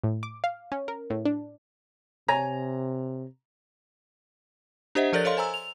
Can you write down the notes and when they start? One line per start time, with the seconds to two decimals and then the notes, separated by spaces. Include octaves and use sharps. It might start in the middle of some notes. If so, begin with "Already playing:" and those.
0.04 A2
0.23 D6
0.44 F5
0.72 C#4
0.88 A#4
1.10 A2
1.25 D4
2.28 C3 C#5 G#5 A#5
4.95 D4 G4 C5 D#5 E5 F#5
5.13 F3 A4 A#4 D5 G6 A6
5.25 A4 C#5 D#5 F5 C6
5.37 C5 G#5 A#5 E6
5.54 F7